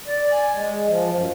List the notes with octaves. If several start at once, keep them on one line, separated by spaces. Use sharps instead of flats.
D5
G#5
G#3
F3
F#2